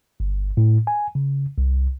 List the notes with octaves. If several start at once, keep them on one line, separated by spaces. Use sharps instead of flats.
G1
A2
G#5
C#3
C2